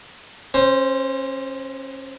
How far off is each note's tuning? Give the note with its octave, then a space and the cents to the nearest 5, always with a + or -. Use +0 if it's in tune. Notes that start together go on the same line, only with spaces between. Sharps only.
C#4 -30 C5 +0